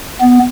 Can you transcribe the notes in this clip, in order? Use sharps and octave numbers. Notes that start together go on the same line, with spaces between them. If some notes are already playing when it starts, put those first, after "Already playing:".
B3